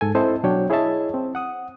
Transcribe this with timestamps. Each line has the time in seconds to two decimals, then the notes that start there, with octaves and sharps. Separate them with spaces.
0.01 G#2 A4 G#5
0.15 C4 E4 A4 C5 D#5 A5
0.44 B2 F#3 D4 C#5 G5
0.70 E4 G#4 C#5 D#5 E5 A5
1.14 C4
1.35 F#5 D#6